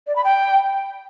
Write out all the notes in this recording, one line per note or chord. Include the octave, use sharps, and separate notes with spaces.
D5
B5
G5